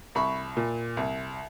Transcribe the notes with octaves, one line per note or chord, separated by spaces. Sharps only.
C2 B5 C#6
A#2
C2